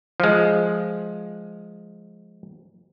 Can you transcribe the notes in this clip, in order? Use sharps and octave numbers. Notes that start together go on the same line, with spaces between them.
F3 G#3